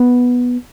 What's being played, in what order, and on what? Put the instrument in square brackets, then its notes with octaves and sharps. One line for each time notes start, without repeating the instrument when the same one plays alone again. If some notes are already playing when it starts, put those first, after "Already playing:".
Already playing: [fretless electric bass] B3